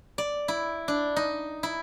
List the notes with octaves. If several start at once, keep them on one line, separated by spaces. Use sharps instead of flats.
D5
E4
D4
D#4
E4